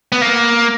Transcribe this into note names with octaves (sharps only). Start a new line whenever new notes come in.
B3
A#3